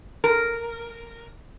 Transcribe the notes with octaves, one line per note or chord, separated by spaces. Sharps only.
A#4